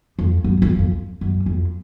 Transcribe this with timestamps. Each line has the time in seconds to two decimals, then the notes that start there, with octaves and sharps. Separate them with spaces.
0.19 F2
0.44 F#2
0.62 F2
0.79 F2
1.21 F#2
1.46 F2